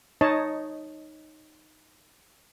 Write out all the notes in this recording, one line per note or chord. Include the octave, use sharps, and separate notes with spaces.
D#4 C#5 D#5 A5